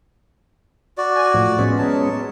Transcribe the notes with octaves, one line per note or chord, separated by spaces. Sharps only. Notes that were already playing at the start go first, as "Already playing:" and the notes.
F#4 D5
G#5
A2 F3
G#3 B3 C#4
F#3 A5